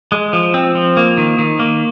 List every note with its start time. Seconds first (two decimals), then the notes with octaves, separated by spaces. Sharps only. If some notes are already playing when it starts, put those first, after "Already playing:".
0.12 G#3
0.33 F3
0.54 C4
0.75 F3
0.97 A#3
1.18 D#3
1.39 D#3
1.59 A#3